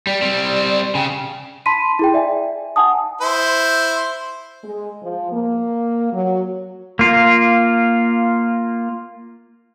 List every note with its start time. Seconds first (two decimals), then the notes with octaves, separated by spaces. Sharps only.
0.07 G3 D5
0.22 G3 C4
0.95 C#3 G5
1.66 A5 B5 C6 B6 D#7
1.99 E4 G#4 G5
2.14 D5 E5 G#5
2.76 F#5 G#5 A5 D#6
3.21 E4 C5
4.64 G#3
5.02 F3
5.32 A#3
6.13 F#3
6.99 A#3 F4